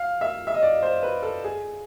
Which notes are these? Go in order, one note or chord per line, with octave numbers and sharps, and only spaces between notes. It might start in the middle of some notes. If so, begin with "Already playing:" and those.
Already playing: F5
E5
E5
D#5
D5
C5
B4
A4
G#4